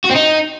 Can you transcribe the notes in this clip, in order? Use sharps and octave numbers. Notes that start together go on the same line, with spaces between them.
F#4
C4
D#4